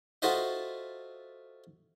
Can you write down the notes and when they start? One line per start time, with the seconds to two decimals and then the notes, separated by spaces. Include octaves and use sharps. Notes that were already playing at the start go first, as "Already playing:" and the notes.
0.22 F4 F#4 A4 C5 D#5 E5